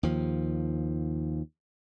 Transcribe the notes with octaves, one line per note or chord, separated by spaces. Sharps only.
D#2 F3